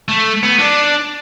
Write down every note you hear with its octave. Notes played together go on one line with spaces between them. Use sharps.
A3
B3
D4